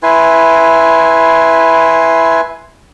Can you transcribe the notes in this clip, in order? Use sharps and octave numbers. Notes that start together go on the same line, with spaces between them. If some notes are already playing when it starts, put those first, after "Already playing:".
E4 B4 G#5 C6